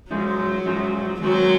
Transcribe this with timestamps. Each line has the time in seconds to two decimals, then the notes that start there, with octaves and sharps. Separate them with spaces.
0.11 G#2 F3 F#3 G#3 D#4
0.66 G#2 F3 G#3 D#4
1.21 D#3 F#3 G#3 C4 D#4 F#4